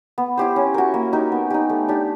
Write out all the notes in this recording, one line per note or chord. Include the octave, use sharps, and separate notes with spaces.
B3
E4 G4 C5
C#4
F#4 A#4
A#3
D#4 G4 A#4
B3
D#4 G4
A3
D4 G4